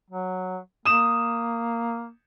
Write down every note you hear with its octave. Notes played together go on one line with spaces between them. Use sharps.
F#3
A#3 D#6 E7